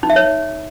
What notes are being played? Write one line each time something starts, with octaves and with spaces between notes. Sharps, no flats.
D#4
E5
C#5